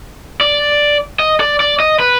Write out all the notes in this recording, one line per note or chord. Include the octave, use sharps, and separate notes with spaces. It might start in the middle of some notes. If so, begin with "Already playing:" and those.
D5
D#5
D5
D5
D#5
B4